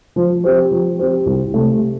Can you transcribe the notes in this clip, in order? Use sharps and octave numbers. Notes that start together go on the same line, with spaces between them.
F3
C4 G4 C5
F3
C4 G4 C5
C2
C3 A3 C4